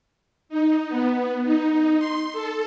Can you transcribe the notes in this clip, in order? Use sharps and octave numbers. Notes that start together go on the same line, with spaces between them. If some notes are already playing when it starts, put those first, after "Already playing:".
D#4
B3
D#4
C6
A4